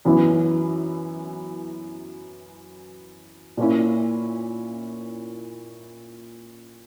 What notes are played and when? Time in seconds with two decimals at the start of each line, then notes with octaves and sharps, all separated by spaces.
0.05 F#2 E3 B3 E4
3.57 A#2 A#3 C#4 E4